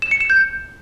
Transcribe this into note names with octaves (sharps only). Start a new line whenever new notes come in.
E7
C#7
E7
G6